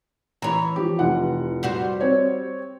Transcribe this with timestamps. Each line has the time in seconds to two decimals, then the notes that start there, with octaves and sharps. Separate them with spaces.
0.42 E3 C#5 A#5 B5
0.76 F3 G4
0.99 F1 F4 F#5
1.63 G3 F#4 C5
2.01 C4 C#5